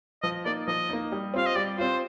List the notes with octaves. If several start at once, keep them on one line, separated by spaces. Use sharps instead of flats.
F3 D#5
A#3 D#4 D5
F3 D#5
A#3 D#4
G3
C4 F4 F5
D#5
G3 D5
C4 F4 C5